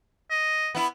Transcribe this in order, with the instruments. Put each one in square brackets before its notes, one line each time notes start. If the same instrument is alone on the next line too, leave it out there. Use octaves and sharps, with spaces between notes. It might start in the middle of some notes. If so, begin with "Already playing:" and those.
[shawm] D#5
[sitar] B3 E4